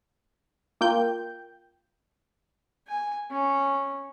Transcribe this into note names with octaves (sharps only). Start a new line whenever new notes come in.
A#3 F4 G5 G6
G#5
C#4